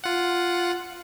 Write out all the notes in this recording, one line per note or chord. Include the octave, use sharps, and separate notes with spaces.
F4 F#5